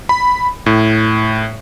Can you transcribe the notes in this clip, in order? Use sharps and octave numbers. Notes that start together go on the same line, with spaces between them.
B5
A2